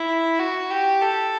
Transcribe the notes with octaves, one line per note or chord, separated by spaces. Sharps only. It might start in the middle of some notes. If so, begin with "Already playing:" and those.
Already playing: E4
F#4
G4
A4